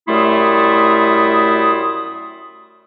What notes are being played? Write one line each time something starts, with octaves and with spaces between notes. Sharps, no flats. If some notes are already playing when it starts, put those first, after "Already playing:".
F#2 G3 A3 E4 C6 D#6